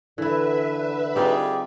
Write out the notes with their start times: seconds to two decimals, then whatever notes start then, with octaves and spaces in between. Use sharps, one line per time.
0.18 D3 E3 E4 B4 E5
1.16 G3 C4 D#4 F4 G4 G#4